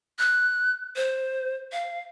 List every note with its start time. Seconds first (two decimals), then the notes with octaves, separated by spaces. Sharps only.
0.19 F#6
0.96 C5
1.72 F5